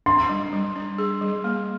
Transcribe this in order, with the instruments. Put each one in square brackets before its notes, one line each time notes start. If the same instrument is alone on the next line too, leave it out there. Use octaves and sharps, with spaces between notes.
[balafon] D4 [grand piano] C6
[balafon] G3
G3
D4
G#4
G3
A#3